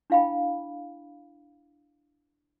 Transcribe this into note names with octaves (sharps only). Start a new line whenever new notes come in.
D4 E4 F5 G5 B5